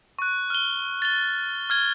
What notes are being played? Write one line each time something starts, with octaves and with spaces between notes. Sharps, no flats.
C#6 F#6
F6 G7
A6 G7
F6 G#6 G7